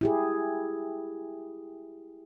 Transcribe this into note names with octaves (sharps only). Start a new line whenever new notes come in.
E4 G4 G#4